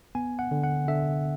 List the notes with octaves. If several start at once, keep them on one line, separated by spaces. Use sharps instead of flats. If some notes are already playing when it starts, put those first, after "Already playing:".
B3 G#5
F#5
D3
F#5
D3 E5